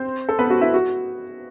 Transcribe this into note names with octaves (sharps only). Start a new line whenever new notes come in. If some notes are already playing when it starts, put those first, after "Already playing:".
Already playing: C4 C5
A4
B3 B4
F#4
E4
F#4